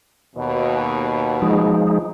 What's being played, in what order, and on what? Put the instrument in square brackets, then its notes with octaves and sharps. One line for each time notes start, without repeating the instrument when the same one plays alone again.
[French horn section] D#2 B2
[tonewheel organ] F3 G#3 D#4